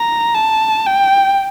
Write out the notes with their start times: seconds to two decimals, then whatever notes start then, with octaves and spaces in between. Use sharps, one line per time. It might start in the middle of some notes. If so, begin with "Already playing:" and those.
Already playing: A#5
0.35 A5
0.87 G5